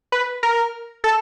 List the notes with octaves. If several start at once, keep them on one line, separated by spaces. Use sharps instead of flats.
B4
A#4
A4